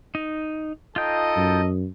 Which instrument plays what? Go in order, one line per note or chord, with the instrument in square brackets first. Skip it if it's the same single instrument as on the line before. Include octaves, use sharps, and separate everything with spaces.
[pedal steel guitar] D#4
[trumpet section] D#4 A4 D#5 [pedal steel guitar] F4 G5
[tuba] F#2